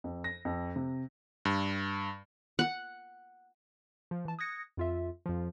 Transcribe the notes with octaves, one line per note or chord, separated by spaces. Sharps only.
F2
A#6
F2
C3
G2
F#5
F3
E3 A5
D#6 F#6 G#6 A#6 C#7
F2 F4 E5
F2 F3